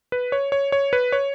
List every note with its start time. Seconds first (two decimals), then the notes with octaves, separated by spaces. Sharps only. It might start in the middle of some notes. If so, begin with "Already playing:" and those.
0.12 B4
0.32 C#5
0.52 C#5
0.72 C#5
0.93 B4
1.12 C#5